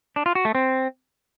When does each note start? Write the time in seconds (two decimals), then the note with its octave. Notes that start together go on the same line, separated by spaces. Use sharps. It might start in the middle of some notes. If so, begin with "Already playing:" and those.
0.16 D4
0.26 F4
0.35 F#4
0.45 A3
0.55 C4